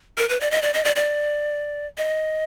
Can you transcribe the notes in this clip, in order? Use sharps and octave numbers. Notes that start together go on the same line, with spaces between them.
A#4
B4
D5
D#5
D5
D#5
D5
D5
D#5